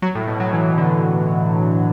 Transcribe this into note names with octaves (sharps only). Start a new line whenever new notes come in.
F#3
A2
B2
F#3
E3
E3
D3